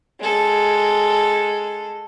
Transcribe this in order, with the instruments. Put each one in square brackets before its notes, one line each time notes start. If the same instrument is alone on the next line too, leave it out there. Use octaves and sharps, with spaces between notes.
[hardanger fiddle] G#3 A4